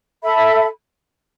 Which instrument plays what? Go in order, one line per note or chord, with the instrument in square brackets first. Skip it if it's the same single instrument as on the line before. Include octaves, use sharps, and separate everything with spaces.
[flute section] A4 E5 B5